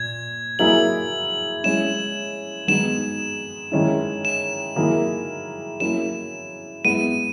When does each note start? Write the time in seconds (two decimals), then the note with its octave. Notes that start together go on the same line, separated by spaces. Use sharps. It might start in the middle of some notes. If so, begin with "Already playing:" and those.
Already playing: A#2 G#6
0.59 F#3 A#3 E4 G#4 F#7
1.64 G#3 C#4 E4 E7
2.67 D#3 G#3 B3 D#4 F#4 E7
3.72 D#3 G#3 C#4 E4
4.25 E7
4.76 D#3 F#3 A#3 E4 G#4
5.80 F#3 A#3 C#4 E4 G#4 E7
6.85 G#3 B3 E4 D#7